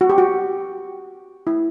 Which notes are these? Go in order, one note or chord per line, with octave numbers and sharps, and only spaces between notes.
F#4
G4
F#4
E4